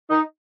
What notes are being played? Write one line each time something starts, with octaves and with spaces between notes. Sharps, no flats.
D#4